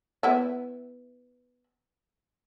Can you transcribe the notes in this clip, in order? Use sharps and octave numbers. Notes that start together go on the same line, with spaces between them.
B3 E4